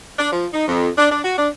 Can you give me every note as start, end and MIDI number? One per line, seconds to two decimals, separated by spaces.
0.19 0.31 62
0.32 0.48 53
0.54 0.65 63
0.68 0.90 41
0.98 1.08 62
1.11 1.24 62
1.25 1.34 66
1.38 1.49 62